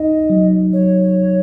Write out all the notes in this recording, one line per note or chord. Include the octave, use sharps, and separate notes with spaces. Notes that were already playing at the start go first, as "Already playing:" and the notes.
Already playing: D#4 D#5
F#3
F#3 C#5